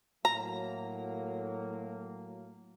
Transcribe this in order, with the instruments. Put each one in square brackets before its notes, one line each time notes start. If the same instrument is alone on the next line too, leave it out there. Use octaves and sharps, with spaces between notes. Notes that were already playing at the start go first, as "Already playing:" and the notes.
[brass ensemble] A2 F#3 A#3 [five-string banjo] A#5